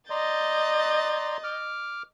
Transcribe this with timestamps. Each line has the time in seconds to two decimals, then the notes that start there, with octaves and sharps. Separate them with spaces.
0.10 D5 D#5 A#5 C6 G6 A6
1.44 D6 F6